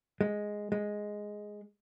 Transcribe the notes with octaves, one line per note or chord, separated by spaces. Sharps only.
G#3
G#3